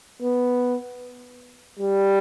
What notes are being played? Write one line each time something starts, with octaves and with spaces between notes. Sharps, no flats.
B3
G3